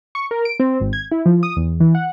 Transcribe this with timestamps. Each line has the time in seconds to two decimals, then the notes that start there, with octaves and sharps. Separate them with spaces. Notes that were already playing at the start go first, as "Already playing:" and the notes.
0.15 C#6
0.31 A#4
0.45 D7
0.60 C4
0.80 G#1
0.93 G#6
1.11 E4
1.26 F3
1.43 D#6
1.57 E2
1.80 E3
1.95 F#5